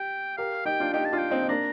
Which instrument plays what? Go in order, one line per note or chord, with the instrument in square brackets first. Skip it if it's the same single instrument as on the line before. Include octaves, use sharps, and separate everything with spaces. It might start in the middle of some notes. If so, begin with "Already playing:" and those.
Already playing: [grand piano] G4 [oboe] G5
[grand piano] G4 A#4 [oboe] F5
[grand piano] D#4 G4 [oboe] G5
[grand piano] D4 F4
[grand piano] D#4 G4 [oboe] G5
[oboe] A5
[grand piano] D4 F4
[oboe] G5
[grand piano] C4 D#4
D#4
[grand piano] A#3 D4 [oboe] A#5